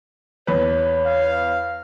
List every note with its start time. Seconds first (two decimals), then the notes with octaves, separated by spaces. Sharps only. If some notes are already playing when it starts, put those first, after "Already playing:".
0.47 E2 B4 C#5
1.06 F5